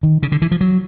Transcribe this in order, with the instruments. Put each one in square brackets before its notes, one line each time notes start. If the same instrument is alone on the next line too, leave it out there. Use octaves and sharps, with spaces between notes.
[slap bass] D#3
C#3
D3
E3
F3
F#3